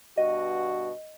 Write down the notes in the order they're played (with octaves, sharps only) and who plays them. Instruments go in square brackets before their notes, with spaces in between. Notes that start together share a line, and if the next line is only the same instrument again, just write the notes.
[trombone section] G2 B2 F#4 [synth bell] D#5